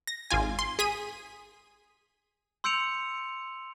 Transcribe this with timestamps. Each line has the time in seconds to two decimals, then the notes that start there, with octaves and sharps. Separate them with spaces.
0.07 A#6
0.31 G#1 F4 G#5
0.59 C6
0.79 G#4 B6 D#7
2.64 C6 E6 G6 C#7 D7 F7